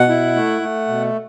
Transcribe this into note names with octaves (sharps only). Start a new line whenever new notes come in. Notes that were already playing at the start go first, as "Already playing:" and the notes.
Already playing: B2 F#5
E4
A3
A3
B2